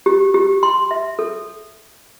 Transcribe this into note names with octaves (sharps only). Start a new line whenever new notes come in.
G4
G4
C6
E5
A4